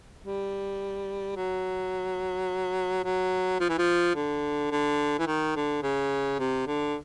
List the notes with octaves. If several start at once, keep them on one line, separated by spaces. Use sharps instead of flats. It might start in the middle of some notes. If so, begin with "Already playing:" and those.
G3
F#3
F#3
F3
E3
F3
D3
D3
E3
D#3
D3
C#3
C3
D3